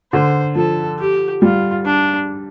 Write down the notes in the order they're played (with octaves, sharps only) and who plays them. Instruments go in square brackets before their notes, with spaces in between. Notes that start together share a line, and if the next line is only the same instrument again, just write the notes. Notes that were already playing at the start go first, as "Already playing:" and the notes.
[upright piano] D3 [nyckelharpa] C5
[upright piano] F3 [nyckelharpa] A4
[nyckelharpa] G4
[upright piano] G3 [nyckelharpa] F4
[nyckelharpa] D4